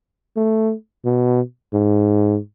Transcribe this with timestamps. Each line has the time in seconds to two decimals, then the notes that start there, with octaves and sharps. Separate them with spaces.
0.37 A3
1.05 B2
1.73 G#2